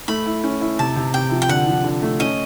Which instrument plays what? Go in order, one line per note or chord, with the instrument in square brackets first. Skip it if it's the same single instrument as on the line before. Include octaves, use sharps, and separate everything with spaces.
[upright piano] A3 [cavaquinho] B5
[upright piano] E4
C#4
E4
[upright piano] C3 [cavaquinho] A5
[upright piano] C3
[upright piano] C3 [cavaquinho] G5
[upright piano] F3
[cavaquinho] G5
[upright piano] D3 [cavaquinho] F#5
[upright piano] F3
D3
A3
[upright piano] C#4 [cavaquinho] D#5